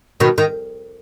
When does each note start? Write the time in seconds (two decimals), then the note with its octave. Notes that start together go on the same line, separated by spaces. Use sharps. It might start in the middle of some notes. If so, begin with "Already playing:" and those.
0.20 B2 D#3
0.38 D#3